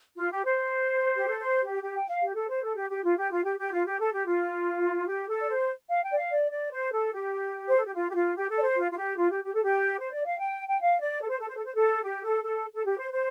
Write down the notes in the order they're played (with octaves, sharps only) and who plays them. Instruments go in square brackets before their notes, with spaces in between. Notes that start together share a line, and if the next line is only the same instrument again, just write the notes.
[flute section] F4
G4
C5
G4
A4
C5
G4
G4
G5
F5
G4
A4
C5
A4
G4
G4
F4
G4
F4
G4
G4
F4
G4
A4
G4
F4
G4
A4
D5
C5
F5
G5
D5
F5
D5
D5
C5
A4
G4
C5
A4
G4
F4
G4
F4
G4
A4
D5
C5
F4
F4
G4
F4
G4
G4
A4
G4
C5
D5
F5
G5
G5
F5
D5
A4
C5
A4
C5
A4
C5
A4
G4
A4
A4
A4
G4
C5
C5